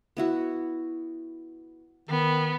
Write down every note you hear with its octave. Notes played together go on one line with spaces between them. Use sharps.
B3 E4 F#4
D#3 B3